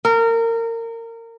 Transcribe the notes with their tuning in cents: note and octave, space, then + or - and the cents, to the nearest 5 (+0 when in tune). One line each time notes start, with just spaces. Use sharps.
A#4 -25